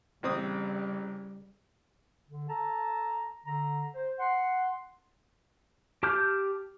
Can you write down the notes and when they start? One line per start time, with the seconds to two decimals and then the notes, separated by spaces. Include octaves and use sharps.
0.23 A1 C#3 G3 C4 D#6
2.29 D3
2.48 A4 A5 A#5
3.45 D3 A#5
3.94 C5
4.19 F#5 C6
6.03 G4 A5 D6 F6 G6